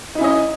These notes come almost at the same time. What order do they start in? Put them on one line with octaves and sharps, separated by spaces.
D#4 E4 C#4 D#5